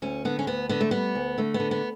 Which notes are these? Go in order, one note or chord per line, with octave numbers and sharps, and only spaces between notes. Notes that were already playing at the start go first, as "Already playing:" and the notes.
D2 C#4
D3 B3
C#4
D2 B3
D3 B3
A3
G3 B3
D2
D3 A3
B3
D3
B3